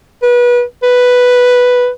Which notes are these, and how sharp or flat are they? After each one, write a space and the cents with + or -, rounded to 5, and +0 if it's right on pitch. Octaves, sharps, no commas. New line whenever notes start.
B4 -30
B4 +0